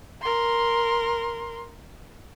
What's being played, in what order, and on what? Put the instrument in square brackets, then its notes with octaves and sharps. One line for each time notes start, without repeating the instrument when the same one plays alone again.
[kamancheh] A#4 C6